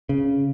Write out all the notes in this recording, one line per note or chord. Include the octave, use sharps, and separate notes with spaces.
C#3